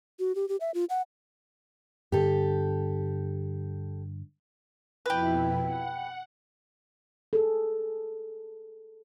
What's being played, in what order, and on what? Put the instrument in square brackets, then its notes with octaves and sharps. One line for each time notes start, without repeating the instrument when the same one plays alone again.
[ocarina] F#4
G4
G4
E5
F4
F#5
[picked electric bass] G2 D3 [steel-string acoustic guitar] G4 A4
[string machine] F2 B2 E4 [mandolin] G4 B4
[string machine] F#5
[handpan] G#4 A4